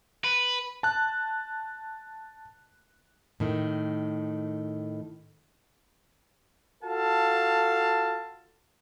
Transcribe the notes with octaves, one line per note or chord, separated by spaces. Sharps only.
B4
A5 F#6
A2 D#3
F4 F#4 A4 F5 A5